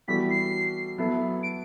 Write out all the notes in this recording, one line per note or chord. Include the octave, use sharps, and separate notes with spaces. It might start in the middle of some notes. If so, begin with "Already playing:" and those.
E3 G3 B3 F#4 A4 B6
C7
F#3 B3 E4 A4
D7